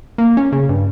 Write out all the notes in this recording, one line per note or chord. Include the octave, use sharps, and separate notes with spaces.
A#3
C#4
C#3
G2